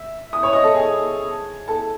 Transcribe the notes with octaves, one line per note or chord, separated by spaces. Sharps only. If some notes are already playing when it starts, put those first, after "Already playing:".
Already playing: E5
D#6
C#5 C#6
D#5 D#6
A4 A5
G#4 G#5
A4 A5